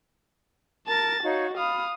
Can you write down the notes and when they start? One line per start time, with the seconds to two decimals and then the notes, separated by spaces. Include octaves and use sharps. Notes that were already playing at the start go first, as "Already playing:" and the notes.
0.87 A#4 A5 A6
1.24 D#4 F#4 C#5 F5
1.57 F5 B5 D#6